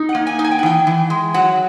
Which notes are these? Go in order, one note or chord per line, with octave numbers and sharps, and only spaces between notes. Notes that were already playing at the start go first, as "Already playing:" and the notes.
Already playing: D#4
F#5
A#3
G#5
D#4
G#5
G5
F#5
E3 G5
E3
G#3
F#3 F#5